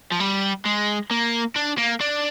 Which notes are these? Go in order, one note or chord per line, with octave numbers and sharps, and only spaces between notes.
F3
G3
G#3
A#3
D4
A#3
D4